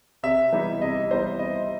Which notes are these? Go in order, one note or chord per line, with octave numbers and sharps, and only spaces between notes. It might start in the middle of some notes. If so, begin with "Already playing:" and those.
C3 E5
E3 G3 B3 D#4
C3 D#5
E3 G3 B3 D#4 C5
C3 D#5